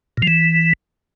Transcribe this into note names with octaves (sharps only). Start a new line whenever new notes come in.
A#2
F3
E3